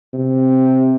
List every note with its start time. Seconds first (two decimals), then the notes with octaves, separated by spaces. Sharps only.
0.13 C3